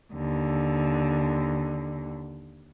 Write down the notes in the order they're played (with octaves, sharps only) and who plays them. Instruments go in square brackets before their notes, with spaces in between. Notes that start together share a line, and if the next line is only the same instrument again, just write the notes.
[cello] D#2 D3